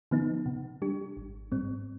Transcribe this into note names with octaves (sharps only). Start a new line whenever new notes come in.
D3 F3 B3 D#4
C3
G3 D4 G4
G#1
G#2 G3 C4